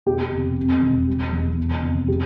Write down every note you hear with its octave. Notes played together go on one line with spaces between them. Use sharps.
B2 G4
F1
C3
E1
G3
E2
B2
F1
G3 G4